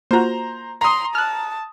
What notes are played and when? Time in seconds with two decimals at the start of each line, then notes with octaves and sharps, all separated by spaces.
0.11 A#3 F4 F#4 C5 A#5
0.81 A#5 C6 D#6
1.15 A5 F6 F#6